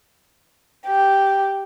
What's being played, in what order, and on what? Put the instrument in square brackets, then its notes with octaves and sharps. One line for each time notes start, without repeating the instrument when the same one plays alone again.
[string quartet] G4